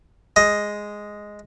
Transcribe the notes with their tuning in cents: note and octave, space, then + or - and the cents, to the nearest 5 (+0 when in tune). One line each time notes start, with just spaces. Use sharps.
G#3 +0 D#5 +5